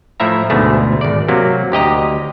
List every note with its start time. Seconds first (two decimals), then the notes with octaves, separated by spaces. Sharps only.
0.20 A2 F3 E4 E5 A#5
0.50 D2 G#2 B2 A3
1.01 G#1 D5
1.28 C3 F#3 A#3
1.72 D2 G4 D#5 A#5